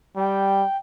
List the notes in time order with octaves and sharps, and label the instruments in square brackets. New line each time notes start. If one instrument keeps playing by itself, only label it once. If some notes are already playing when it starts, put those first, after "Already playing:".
[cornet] G3 [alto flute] G5